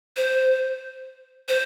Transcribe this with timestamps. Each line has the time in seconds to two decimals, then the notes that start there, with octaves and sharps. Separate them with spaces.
0.17 C5
1.48 C5